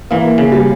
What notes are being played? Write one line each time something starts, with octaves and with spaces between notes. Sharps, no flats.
E3 A#3
C#3
G3